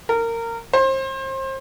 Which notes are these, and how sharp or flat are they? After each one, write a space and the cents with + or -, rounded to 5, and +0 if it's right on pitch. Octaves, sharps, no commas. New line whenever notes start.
A#4 -20
C5 +30